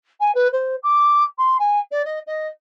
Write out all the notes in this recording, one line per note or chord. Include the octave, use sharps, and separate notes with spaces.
G#5
B4
C5
D6
C6
G#5
D5
D#5
D#5